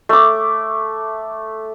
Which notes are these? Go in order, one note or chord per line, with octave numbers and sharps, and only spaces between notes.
A3 D6